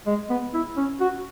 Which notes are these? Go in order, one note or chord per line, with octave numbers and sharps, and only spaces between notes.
G#3
B3
E4
C#4
F#4